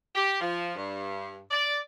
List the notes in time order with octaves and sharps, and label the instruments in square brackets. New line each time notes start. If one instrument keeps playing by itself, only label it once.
[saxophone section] G4
F3
G2
D5